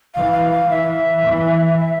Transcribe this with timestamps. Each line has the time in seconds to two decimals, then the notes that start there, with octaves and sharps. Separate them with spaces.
0.15 E3 F5
0.32 F5
0.51 F5
0.69 E3 E5
1.24 E3
1.79 E5